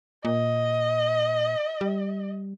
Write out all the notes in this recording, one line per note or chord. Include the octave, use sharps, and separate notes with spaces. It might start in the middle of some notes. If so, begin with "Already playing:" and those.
A#2 D#5
G3